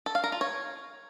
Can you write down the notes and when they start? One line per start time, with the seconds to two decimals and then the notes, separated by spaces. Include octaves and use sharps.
0.06 A4
0.15 F5
0.24 A#4
0.32 F4
0.41 C#5